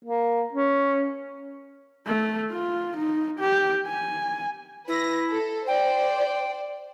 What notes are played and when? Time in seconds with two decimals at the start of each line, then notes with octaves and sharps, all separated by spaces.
0.05 A#3
0.53 C#4
2.07 A3
2.52 F4
2.97 D#4
3.40 G4
3.87 G#5
4.88 E4 B4 A#6
5.29 A4
5.67 C5 D5 G5